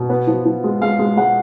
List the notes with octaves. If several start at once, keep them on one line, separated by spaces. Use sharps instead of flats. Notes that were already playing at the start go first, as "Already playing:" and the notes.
Already playing: B2
B3
F3
F3
G#3
G#3 F5
G#3
G#3 F#5